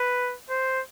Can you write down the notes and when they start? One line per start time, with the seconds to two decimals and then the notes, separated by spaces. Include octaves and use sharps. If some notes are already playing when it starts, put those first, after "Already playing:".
Already playing: B4
0.50 C5